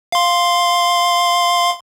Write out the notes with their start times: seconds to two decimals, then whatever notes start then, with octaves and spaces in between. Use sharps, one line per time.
0.12 F5 C6